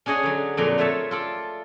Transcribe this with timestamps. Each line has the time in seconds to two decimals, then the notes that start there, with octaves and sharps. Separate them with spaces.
0.06 C#4 D4 G#4 C#5 D#5 F#5
0.23 D3 F#3
0.57 F2 A#2 D3 F#3 D5 A#5
0.78 A3 F4 C#5 E5 A5
1.11 F4 A4 D5